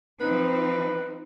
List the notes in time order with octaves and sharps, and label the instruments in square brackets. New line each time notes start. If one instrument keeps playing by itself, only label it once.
[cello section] F3 C4 D#4 [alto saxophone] B4